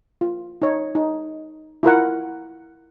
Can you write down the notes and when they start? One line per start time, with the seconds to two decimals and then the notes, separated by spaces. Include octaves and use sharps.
0.21 F4
0.62 D#4 C#5
0.95 D#4
1.83 E4 F4 A#4 F#5